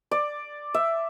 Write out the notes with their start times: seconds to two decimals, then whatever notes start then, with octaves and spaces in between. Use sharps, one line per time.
0.11 D5
0.74 E5